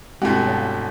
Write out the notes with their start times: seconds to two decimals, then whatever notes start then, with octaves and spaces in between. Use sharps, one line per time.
0.22 G1 B2 G#3 C4 E4 F#4 G4
0.47 C#5 F5 A5